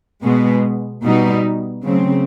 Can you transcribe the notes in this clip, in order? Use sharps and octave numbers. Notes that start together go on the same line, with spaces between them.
B2 G#3 B3
B2 G3 B3 D#4
C#3 F#3 A3 C4